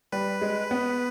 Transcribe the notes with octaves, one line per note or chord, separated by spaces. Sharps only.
G3 B4
G#3
B3